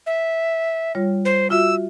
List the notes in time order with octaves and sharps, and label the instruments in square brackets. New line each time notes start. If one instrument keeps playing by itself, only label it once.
[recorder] E5
[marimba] G3 F4 C#5
[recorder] C5
[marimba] F4 F#4 E5 [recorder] E6